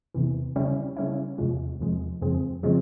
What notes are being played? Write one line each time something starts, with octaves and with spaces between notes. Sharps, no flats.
E2 C3 E3
C#3 G3 C#4 E4
C#3 G3 C#4 E4
E2 C3 F3 G#3
E2 C3 F3 G#3
F2 C#3 F3 G#3 C4
C#3 F3 G#3 C4